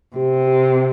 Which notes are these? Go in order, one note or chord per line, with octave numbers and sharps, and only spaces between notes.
C3 G4
G4
G4